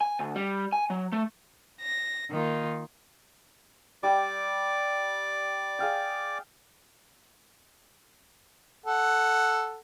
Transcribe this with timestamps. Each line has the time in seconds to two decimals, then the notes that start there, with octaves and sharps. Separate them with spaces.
0.01 G#5
0.19 D2
0.35 G3
0.73 G#5
0.90 F#3
1.12 A3
1.82 A#6
2.30 D#3 A#3 D#4 F4
4.03 G3 G4 D5 G5 D6
5.79 G#4 F5 G5
8.86 A4 F#5